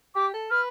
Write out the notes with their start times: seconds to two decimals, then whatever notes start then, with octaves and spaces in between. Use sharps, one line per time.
0.15 G4 D6
0.34 A4
0.51 B4 F6